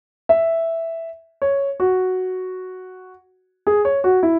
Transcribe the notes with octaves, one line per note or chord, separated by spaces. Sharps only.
E5
C#5
F#4
G#4
C#5
F#4
E4